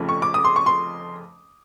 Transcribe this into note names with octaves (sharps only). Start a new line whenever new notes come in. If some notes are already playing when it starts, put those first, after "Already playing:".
Already playing: F1 F2 C#3 F3 A3
C#6
D6
D#6
C6
C#6
C6